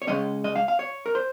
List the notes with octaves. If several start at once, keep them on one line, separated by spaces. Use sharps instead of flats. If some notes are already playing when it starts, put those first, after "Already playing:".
C#5
C#3 G#3 C#4 D#5
D#5
F5
F5
C#5
A#4
C5